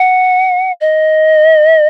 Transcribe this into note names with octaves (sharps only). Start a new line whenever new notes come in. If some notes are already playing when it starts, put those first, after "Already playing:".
Already playing: F#5
D#5